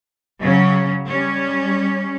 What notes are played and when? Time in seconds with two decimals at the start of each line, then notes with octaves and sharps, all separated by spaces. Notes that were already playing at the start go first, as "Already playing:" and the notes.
0.39 C#3 F#3 C#4
1.08 G3 C#4